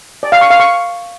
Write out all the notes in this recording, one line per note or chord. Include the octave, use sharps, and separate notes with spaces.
D5
F5
C#6
F5
C#6